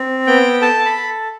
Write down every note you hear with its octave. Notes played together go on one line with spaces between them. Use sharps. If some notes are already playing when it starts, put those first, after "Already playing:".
Already playing: C4
B3 G5
A4 A5
B5
A4